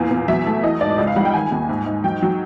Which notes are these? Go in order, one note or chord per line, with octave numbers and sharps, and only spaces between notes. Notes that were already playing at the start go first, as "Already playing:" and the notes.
Already playing: E2 A#2 F5
E2
F#3 E5
A3
E3 D#5
G#2 D5
C#2 D#5
F5
G3 F#5
G5
D#3 G#5
D#2
G#2
G#2
F#3 G5
F#3